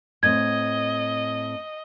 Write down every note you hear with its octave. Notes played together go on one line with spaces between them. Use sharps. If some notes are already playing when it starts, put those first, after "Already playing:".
A2 C4 D#5 G#6